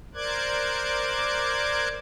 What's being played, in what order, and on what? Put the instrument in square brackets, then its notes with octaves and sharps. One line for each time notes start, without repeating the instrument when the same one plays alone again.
[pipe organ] A#4 C5 D5 D6 F#6 G#6